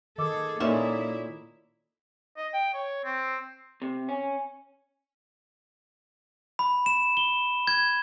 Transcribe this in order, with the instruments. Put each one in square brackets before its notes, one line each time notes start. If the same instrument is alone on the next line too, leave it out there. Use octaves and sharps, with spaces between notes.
[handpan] D#3 [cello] G#4 A4 [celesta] D#5 D6 E6
[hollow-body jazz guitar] A#2 C#4 E5 [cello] A#3 E4 [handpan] D#4 G#4 A4
[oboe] D#5
G5
C#5
C4
[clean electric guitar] C3
C#4
[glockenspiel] B5
E7
G7
G#6